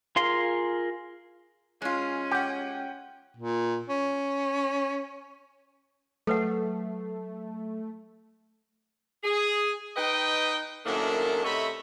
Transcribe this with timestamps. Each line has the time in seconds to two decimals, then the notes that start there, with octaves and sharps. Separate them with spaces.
0.16 F4 G#4 A#4 F5 C6
1.82 G#3 C#4 F4
2.32 G4 F#5 G5
3.37 A#2
3.88 C#4
6.27 F#3 A3 A4 B4 F#5
9.24 G#4
9.97 D#4 B4 D#5 G5
10.86 F#2 A2 D#3 A#3 D4
11.44 C3 A3 C#5 D#5 E5 B5